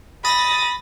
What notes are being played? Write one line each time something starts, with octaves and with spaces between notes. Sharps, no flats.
B5 D#6 A6 A#6